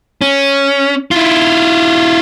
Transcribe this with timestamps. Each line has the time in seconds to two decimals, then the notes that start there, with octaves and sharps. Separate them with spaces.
0.21 C#4
1.11 E4 F4